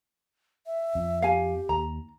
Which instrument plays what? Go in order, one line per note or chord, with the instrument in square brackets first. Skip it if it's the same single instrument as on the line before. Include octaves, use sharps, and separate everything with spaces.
[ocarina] E5
[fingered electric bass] F2
[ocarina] G4 [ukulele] F5 G#5
[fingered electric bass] D#2 [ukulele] A#5